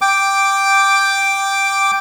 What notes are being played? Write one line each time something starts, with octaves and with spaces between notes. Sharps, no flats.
G5 D6